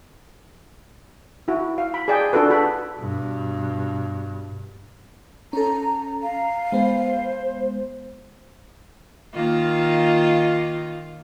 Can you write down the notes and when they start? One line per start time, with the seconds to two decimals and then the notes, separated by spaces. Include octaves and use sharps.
1.48 E4 F#4
1.78 F5
1.94 B5
2.08 G#4 D5 G5
2.33 D4 F4 F#4 A4 B4
2.50 F#4 A4 B5
2.99 G2 B2
5.53 C#4 A4 A#5
6.23 F5 A#5
6.72 G#3 B3 C5
9.34 D#3 A#3 F4